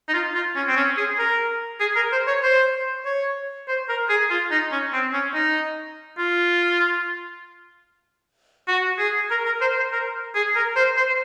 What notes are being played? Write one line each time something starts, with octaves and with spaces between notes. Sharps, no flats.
D#4
F4
F4
C#4
C4
C#4
G#4
A#4
G#4
A#4
C5
C#5
C5
C#5
C5
A#4
G#4
F4
D#4
C#4
C4
C#4
D#4
F4
F#4
G#4
A#4
A#4
C5
C5
A#4
G#4
A#4
C5
C5